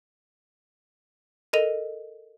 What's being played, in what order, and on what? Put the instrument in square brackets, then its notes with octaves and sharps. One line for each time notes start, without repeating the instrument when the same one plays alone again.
[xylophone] A4 A#4 D#5 D#7 F7